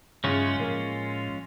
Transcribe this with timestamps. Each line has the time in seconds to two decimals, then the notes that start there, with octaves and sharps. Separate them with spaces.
0.24 G2 C#3 F#3 G#3 C#4 F4 E5
0.60 A2 F3 A#3